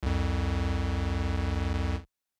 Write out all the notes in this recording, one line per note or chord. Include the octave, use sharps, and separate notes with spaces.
C2 F2